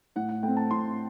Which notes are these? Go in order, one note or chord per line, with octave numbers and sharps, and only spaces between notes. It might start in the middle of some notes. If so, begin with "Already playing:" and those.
A2 F#5
F#5
A3 C4 G5
A5
A2 C6